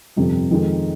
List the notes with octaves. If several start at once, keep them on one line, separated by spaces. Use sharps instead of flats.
G1 F2 C3
F2 D#3 G#3 D#4